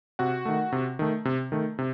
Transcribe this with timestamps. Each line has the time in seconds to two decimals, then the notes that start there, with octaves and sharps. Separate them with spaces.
0.19 C3 F#4 F#5
0.45 D#3 A3
0.72 C3
0.99 D#3 A3
1.25 C3
1.52 D#3 A3
1.79 C3